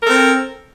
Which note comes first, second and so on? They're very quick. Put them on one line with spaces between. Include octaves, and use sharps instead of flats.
A#4 A4 C4